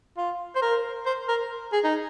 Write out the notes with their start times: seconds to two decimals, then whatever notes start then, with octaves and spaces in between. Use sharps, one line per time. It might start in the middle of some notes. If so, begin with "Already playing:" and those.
0.17 F4
0.55 C5
0.62 A#4
1.06 C5
1.28 A#4
1.72 G#4
1.84 D#4